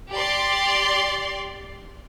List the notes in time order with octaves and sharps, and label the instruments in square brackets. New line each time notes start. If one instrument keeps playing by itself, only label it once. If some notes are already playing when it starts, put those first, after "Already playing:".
[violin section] G4 D5 C6